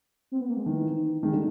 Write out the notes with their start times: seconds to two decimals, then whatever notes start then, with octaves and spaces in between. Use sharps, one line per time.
0.32 C4
0.40 B3
0.49 A#3
0.57 G#3
0.66 D#3 E3
1.23 D#3 G#3
1.32 D3 G3